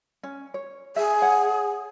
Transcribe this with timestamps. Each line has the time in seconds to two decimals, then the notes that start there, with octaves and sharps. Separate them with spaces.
0.23 C#4
0.54 C#5
0.96 G#4 E5
1.22 C#5 F#5